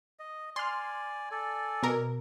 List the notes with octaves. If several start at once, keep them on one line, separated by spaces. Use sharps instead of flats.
D#5
D5 G#5 C6 F6
A4 D5 G#5
B2 A#4